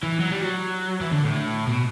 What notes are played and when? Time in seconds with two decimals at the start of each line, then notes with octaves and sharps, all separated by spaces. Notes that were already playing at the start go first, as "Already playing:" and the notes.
0.03 E3
0.20 F#3
0.30 G3
0.41 F#3
1.01 E3
1.12 D3
1.24 A2
1.67 B2